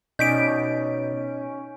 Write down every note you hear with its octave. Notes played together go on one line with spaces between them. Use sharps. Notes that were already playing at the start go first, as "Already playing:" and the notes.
B2 C#4 D#4 D5 D#5 G6 B6 D7